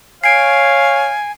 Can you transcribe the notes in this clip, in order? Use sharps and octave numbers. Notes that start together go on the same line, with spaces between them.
C#5 F5 G#5 C7 D7